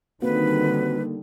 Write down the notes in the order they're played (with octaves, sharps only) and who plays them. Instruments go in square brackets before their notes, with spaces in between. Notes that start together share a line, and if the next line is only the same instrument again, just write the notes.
[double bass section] D3 D#3 G3 [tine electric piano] A#3 [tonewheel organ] C4 F#4 [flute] B4